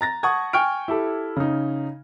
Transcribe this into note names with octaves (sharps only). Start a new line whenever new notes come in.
A#5 A6 A#6
F#5 A5 C#6 D#6 G#6
G5 G#5 C#6 F6 D7
E4 G4 A4
C#3 D#4